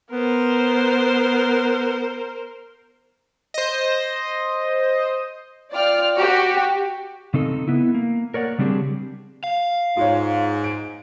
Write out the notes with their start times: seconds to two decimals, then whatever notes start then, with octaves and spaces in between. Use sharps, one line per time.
0.12 B3 A#4 C5
3.54 C5 D#5
5.73 F4 D5 G5 F6
6.16 F#4 G4
7.34 C#3 C4 D#4 A4
7.68 B3 E4
7.95 A#3
8.34 A#4 C#5 D5 F#5
8.59 C#3 G3 C4 D4 G4 G#4
9.44 F5
9.97 G#2 F4 C#5
10.64 D7